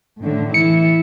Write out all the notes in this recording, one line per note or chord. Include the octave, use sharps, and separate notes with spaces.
A2 D3 A3
E3 E4 C#7